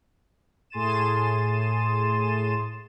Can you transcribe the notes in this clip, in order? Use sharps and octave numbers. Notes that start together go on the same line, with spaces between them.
A2 G#4 C6 A6 D#7 E7